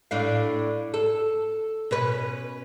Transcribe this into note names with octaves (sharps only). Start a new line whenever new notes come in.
A2 D4 F5
A4
B2 C#4 B4